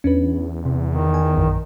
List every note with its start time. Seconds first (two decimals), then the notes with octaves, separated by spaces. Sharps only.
0.04 E2 C#4 D4 B4
0.65 C3
0.89 D#3
1.14 G#5
1.36 A#1 F#2